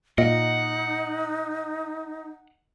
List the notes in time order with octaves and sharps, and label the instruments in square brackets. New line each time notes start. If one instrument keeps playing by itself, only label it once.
[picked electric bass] A#2 [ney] D#4 [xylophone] D#5 [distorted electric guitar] F#5